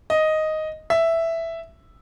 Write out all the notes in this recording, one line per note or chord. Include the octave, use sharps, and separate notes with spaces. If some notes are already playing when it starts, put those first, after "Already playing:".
D#5
E5